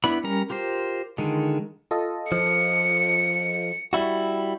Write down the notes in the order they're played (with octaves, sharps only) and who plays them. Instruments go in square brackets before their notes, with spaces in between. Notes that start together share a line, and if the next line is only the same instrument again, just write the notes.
[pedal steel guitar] B3 D4 E4 B5
G3 C#4 A#4 A#5
F4 G4 A#4 C5
D3 D#3 G#3 F4
[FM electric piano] F4 A4 D#5
[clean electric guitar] F3 [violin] C#7
[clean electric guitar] G3 E4 F#4